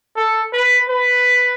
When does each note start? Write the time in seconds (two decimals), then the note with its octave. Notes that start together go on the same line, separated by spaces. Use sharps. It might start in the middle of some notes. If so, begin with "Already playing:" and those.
0.16 A4
0.53 B4
0.89 B4